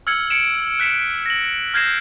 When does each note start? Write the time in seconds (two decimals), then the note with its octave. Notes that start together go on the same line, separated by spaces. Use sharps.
0.07 E6 F6 G#6 C#7 F#7
0.30 C#7 D7 E7
0.80 F#6 B6 C#7 E7
1.26 A#6 F#7
1.74 F6 G6 G#6 A#6 C7 E7